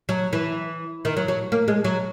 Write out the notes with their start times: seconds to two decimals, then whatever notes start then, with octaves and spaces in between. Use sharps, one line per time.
0.09 F#3
0.33 E3
1.05 D#3
1.17 F#3
1.28 F#3
1.52 A#3
1.68 G#3
1.84 F#3